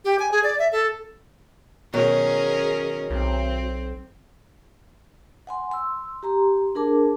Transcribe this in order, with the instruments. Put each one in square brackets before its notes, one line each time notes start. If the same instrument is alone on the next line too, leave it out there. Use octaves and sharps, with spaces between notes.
[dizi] G4
G#5
G#4
D5
E5
A4
[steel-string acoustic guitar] B2 D#3 F#3 [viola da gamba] C#4 G#4 A#4
[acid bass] B1 [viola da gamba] C4
[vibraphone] F#5 G#5 C6
C6 E6
G4 A#5 C6
D4 G#4 A#4 A5 D6